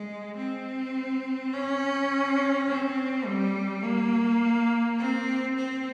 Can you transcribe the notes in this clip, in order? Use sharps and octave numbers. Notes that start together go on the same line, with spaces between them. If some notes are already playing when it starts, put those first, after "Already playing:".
Already playing: G#3
C4
C#4
C4
G3
A#3
C4
C4